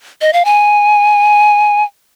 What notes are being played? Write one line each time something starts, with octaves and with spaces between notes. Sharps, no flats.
D#5
F5
G#5